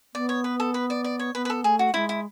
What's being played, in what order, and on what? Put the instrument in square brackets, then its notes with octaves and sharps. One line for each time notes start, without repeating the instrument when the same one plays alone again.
[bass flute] B3 [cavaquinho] D5
[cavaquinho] C#5
B4
A4
B4
D5
D5
C#5
[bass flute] B3 [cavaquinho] B4
[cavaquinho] B4
A4
[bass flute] A3 [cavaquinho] G#4
[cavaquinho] F#4
[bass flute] G#3 [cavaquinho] E4
[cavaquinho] E4